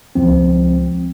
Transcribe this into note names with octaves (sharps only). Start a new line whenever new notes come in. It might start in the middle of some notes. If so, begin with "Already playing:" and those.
C#2 F3 C4